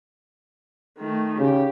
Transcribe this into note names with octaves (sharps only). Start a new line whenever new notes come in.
D#3 A3
C#3 G4